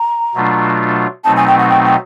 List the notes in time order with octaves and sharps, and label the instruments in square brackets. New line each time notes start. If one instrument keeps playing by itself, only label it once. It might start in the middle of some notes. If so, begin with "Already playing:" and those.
Already playing: [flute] A#5
[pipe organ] B2 F#3 A3 D4 F4
[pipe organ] B2 F#3 A3 C4 D#4 [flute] A5
[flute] G#5
G5
F#5
G5
G5